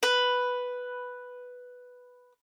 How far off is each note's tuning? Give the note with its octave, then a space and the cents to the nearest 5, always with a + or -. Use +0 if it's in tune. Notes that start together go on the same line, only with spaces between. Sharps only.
B4 +0